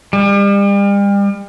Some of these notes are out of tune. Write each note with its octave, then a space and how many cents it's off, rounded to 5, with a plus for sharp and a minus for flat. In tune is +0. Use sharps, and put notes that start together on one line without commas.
G3 +40